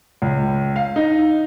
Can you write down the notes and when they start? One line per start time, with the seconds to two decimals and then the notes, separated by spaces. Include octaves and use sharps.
0.22 C#2
0.76 F5
0.96 D#4